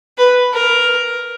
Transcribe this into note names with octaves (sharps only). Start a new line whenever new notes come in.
B4
A#4